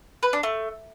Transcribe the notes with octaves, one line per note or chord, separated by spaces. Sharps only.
B4
D4
A3